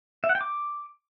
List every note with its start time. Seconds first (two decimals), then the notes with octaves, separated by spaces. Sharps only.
0.24 E5
0.29 F#5
0.35 G5
0.41 D6